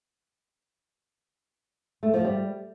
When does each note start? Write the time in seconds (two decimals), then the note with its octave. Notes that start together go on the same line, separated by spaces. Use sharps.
2.03 A3
2.14 F3
2.25 G3